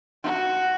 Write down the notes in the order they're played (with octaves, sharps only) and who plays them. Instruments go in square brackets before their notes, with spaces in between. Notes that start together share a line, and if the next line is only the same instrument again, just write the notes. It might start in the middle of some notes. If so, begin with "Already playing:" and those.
[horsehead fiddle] F#4